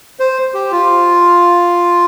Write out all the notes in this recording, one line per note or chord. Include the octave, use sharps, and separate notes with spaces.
C5
G4
F4